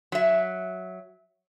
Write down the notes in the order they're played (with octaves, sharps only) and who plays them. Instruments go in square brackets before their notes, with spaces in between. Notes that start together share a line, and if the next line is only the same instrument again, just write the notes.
[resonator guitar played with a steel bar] F#3 E5